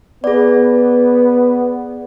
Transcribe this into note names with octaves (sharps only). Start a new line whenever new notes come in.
B3 G#4 D5